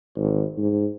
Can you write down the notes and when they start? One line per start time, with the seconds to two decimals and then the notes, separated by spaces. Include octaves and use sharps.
0.16 G#1
0.58 G#2